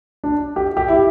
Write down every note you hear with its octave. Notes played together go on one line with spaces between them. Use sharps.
D4
G4
G4
E4